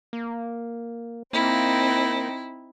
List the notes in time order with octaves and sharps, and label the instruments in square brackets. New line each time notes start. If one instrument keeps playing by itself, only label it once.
[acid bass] A#3
[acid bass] A#3 [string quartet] C4 D#4 [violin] E4